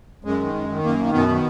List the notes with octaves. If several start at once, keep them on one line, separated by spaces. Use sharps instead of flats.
F#2 G#3
D#3
F#2
D#3
F#2 A#3
D#3
F#2 B2 B3
D#3